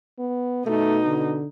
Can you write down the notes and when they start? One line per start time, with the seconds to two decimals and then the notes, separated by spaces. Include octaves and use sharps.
0.19 B3
0.66 B2 A3 D#4
1.06 D3